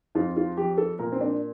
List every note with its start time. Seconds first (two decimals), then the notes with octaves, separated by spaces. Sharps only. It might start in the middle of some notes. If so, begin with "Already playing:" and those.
0.15 F2 F4
0.37 F4
0.57 F3 G4
0.78 A4
0.99 A#2 A#4
1.12 C4
1.21 D4